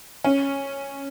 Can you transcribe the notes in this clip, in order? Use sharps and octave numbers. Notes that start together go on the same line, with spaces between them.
C#4